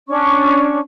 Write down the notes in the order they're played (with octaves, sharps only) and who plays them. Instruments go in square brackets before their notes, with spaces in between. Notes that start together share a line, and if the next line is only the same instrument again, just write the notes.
[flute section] C#4 D4 C#6